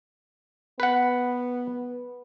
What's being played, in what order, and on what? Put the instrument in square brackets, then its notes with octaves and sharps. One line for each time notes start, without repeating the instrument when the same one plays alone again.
[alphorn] B3 [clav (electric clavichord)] B4 F#5